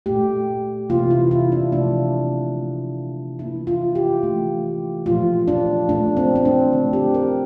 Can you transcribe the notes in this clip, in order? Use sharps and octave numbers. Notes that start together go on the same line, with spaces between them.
A#2 A3 G4
C3 E3 A#3 F4
E4
E4
D4
C3 F3 A3 D4
D3 A3
E3 A#3 E4
F4
G4
E3 A3
A#2 F3 A3 F4
D4
A#2 A3 D4
C4
C4
D4
D3 A3
G4
A#4